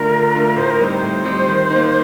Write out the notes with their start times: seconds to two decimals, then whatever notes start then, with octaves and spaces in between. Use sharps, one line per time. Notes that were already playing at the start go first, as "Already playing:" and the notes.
Already playing: D3 A3 D4 F4 A#4
0.11 D3
0.35 A3 D4 F4
0.56 A2 C5
0.70 A#4
0.80 G3 C4 D#4 C5
1.03 A2
1.25 G3 C4 D#4
1.48 D#3
1.70 D#4
1.76 A#3